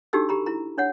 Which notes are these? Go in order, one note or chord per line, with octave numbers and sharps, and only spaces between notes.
D4 D#4 F#4 G4 A4 E6
G4 A#5 B5
E4 A#5
D4 C#5 F#5